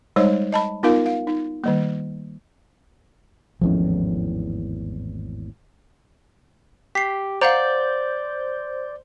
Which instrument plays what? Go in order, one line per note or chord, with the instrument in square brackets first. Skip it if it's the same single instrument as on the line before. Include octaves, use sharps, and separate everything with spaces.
[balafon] G3 G#3 D#4 C5 C#5
D#5 A5 B5
B3 D#4 F4 A#4 F5
F5
D#4
D#3 G3 A#3
[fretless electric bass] G#1 E2 A2 [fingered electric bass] F3 C#4
[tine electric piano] G4 [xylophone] B6 C7
[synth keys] C5 G6 [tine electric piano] D5 [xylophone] F5 F#5 A#5